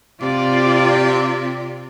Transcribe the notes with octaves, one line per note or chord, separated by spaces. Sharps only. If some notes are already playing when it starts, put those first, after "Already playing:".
C3 F4 D5